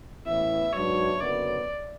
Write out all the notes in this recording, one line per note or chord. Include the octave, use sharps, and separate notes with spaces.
A1 A2 E3 B3 E4 E5
G#2 F#3 B3 D4 F#4 C#5
F#1 F#2 D3 F#3 B3 D5